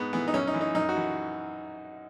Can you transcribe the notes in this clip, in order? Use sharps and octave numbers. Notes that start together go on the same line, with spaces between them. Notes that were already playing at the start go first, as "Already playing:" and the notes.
Already playing: G#2 B3
E3 B3
D#4
F#2 C#4
D#4
E3
D#4
F#2 D#4
F#4
E3